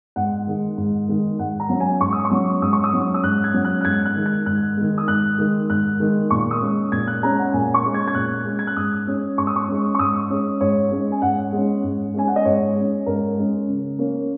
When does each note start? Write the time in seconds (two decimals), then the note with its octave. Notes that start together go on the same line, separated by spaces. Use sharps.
0.16 G#2 F#5
0.47 D#3 G#3
0.77 G#2
1.09 D#3 G#3
1.39 G#2 F#5
1.60 A#5
1.70 F#3 C#4
1.80 G#5
2.01 G#2 C#6
2.12 D#6
2.25 C#6
2.31 F#3 C#4
2.62 G#2 D#6
2.73 C#6
2.84 D#6
2.93 F#3 C#4
3.14 D#6
3.23 G#2 F#6
3.44 G#6
3.54 F#3 C#4
3.65 F#6
3.81 F#6
3.85 G#2 G#6
4.05 F#6
4.16 D#3 G#3
4.26 G#6
4.46 G#2 F#6
4.77 D#3 G#3
4.98 D#6
5.08 G#2 F#6
5.38 D#3 G#3
5.69 G#2 F#6
6.00 D#3 G#3
6.30 A#2 C#6
6.51 D#6
6.61 G#3 C#4
6.92 A#2 G#6
7.07 F#6
7.23 G#3 C#4 A#5
7.38 F#5
7.53 A#2 G#5
7.74 C#6
7.84 G#3 C#4
7.94 G#6
8.07 G#6
8.15 A#2 F#6
8.45 G#3 C#4
8.59 G#6
8.67 F#6
8.76 G#2 D#6
9.07 G#3 C#4
9.38 G#2 C#6
9.47 D#6
9.56 C#6
9.68 G#3 C#4
9.94 C#6
9.99 G#2 D#6
10.30 G#3 C#4
10.60 G#2 C#5
10.91 G#3 C#4
11.12 G#5
11.22 G#2 F#5
11.53 G#3 C#4
11.84 G#2
12.14 G#3 C#4 G#5
12.28 F#5
12.36 D#5
12.45 G#2 C#5
12.76 G#3 C#4
13.06 G#2 A#4
13.38 G#3 C#4
13.68 C#3
13.98 A#3 C#4